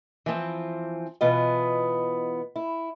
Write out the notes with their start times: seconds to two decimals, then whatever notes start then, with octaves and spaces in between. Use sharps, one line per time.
0.26 E3 F3 C4
1.21 B2 E3 B3 F4 D#5
2.56 E4